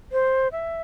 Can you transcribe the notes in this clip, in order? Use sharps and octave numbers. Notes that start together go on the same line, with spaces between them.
C5
E5